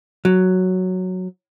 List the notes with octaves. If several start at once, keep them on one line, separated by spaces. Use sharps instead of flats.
F#3